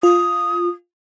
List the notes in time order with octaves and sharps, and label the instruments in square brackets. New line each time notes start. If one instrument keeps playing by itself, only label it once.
[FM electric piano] F4 [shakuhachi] D#6